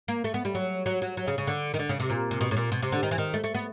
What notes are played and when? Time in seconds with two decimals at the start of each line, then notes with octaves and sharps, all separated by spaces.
0.08 A#3
0.24 A3
0.34 B3
0.45 G3
0.55 F#3
0.86 F#3
1.02 F#3
1.17 F#3
1.28 C#3
1.38 C#3
1.47 D3
1.74 D#3
1.79 D3
1.89 C#3
2.00 C3
2.10 A#2
2.31 C3
2.41 B2
2.51 A2
2.57 A#2
2.72 B2
2.82 C3
2.92 D3
3.03 D#3
3.11 E3
3.18 D#3
3.34 A3
3.44 A3
3.55 B3